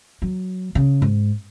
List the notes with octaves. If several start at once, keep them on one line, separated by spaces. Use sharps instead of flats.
F#3
C#3
G#2